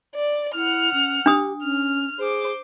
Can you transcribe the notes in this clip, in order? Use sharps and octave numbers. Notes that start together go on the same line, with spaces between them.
D5
E4 F#5 F6
C#4
D4 G4 D#6
C#4 F6
G#4 C5 D6